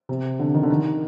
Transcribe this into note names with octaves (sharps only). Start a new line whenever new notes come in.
C3
D3
D#3
D3
D#3